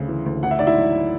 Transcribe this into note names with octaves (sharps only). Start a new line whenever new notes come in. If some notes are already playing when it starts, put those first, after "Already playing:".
Already playing: D2 C#3
E3
D2
A1 F#5
E5
G#2 D5
E4 E5
F#3